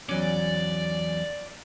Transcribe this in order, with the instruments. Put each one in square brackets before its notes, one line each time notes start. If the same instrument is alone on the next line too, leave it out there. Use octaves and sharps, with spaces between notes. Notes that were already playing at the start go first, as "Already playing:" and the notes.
[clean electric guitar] E2 F#3 C#4 [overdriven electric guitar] D5